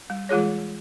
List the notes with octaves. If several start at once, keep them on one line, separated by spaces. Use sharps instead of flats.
G3
E3 G#3 F4 G#4 C#5